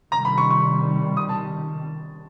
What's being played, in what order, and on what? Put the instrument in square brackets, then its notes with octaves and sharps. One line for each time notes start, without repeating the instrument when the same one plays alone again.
[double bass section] C3 D#3 G3 [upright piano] A#5
[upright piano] B5
C#6
C#6
D#6
A5